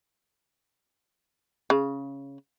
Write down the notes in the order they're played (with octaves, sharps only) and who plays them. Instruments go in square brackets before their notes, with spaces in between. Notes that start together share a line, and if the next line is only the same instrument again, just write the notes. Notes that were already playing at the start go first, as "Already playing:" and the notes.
[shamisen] C#3